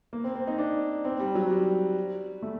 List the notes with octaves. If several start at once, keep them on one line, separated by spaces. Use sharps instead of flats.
A#3
C4
C4
D#4
D4
C4
G3
F#3
G3
A3